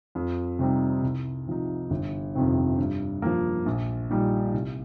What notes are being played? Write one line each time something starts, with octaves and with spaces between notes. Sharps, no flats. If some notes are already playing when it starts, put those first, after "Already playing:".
F2
C3 G3 C4 D#4
C2
C3 F3 D#4
G1
F2 C3 D#3 C4
G2
F3 A#3
A#1
A#2 G3 D#4
C2